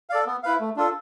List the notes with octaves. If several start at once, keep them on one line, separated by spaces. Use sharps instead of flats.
A4 D5 F5
B3
E4 B4 F5
A3
D4 F4 A4